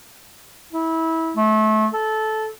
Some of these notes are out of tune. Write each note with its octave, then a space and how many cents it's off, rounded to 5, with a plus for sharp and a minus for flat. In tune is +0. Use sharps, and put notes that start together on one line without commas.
E4 -25
A3 -25
A4 -15